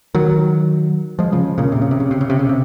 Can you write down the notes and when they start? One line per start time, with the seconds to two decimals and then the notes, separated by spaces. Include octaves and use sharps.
0.14 D#3 F#3
1.19 F3 G#3
1.32 C#3 F3
1.58 A#2 C#3
1.72 C3
1.82 C#3
1.91 C3
2.00 C#3
2.11 C3
2.21 C#3
2.30 C3
2.39 C#3
2.49 C3